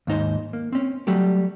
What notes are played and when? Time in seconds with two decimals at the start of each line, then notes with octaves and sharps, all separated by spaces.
0.07 D#2 G#2 D#4 C5
0.53 A#3
0.73 C4 C#4
1.07 F#3 G3 A3 G4